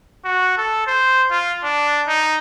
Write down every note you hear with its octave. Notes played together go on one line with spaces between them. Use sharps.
F#4
A4
C5
F4
D4
D#4